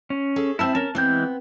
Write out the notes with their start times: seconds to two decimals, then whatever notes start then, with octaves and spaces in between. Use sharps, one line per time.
0.10 C#4
0.36 G#4 A4 E5
0.59 C4 E4 C5 E5 A5
0.75 C#4 A#4 A5
0.95 E3 G#3 B3 C4 G6